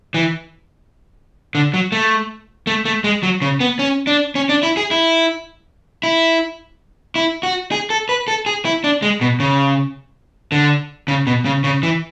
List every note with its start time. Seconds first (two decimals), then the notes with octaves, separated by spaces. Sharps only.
0.14 E3
1.55 D3
1.74 F#3
1.92 A3
2.67 A3
2.85 A3
3.04 G#3
3.23 F#3
3.42 C#3
3.60 B3
3.79 C#4
4.07 D4
4.35 C#4
4.49 D4
4.63 E4
4.77 G#4
4.91 E4
6.03 E4
7.16 E4
7.43 F#4
7.72 G#4
7.90 A4
8.09 B4
8.28 A4
8.46 G#4
8.65 E4
8.84 D4
9.02 G#3
9.21 B2
9.40 C#3
10.52 D3
11.08 C#3
11.27 B2
11.45 C#3
11.64 C#3
11.83 E3